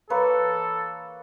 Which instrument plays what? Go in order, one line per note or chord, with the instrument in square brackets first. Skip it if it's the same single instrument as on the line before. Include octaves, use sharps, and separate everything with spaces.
[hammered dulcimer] E3 [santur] A#3 B4 C#5 [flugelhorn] A4